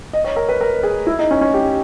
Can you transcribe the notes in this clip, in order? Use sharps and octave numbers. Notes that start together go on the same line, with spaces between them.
D#5
C#5
A#4
B4
A#4
G#4
E4
D#4
C#4
C#4
G4